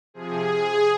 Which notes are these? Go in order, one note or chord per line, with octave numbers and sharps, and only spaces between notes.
C3 F3 G#4